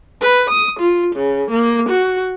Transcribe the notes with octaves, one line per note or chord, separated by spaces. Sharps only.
B4
D#6
F4
C#3
A#3
F#4